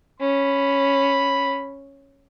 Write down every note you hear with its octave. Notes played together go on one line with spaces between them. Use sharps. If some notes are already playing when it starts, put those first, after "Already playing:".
C#4 B5